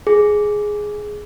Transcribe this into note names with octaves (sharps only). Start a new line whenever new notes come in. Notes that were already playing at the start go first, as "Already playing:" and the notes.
G#4